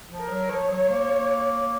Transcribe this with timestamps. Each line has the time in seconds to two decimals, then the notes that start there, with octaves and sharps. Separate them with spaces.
0.10 F3
0.20 A#4
0.30 F#3
0.49 F3 C#5
0.70 F#3
0.90 A#3
1.10 A#3